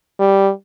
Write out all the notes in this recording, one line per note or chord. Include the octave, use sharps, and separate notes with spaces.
G3